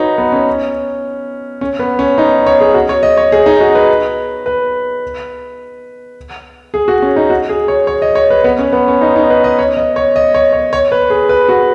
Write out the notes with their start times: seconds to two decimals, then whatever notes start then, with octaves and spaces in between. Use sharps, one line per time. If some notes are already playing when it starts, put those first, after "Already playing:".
Already playing: D#4 F#4 B4 C#5
0.18 B3
0.32 C#4
1.61 C#4
1.79 B3
1.99 C#4
2.18 D#4
2.47 C#5
2.60 G#4
2.74 F#4
2.89 C#5
3.03 D#5
3.17 C#5
3.32 G#4
3.46 D#4
3.60 F#4
3.75 B4
4.46 B4
6.74 G#4
6.88 F#4
7.02 C#4
7.16 D#4
7.30 F#4
7.49 G#4
7.68 C#5
7.87 C#5
8.02 D#5
8.15 C#5
8.30 B4
8.44 B3
8.59 C#4
8.73 B3
8.88 C#4
9.01 D#4
9.16 D#4
9.30 B4
9.44 D#5
9.59 C#5
9.77 D#5
9.96 C#5
10.16 D#5
10.35 C#5
10.53 C#5
10.73 C#5
10.92 B4
11.10 G#4
11.29 B4
11.49 F#4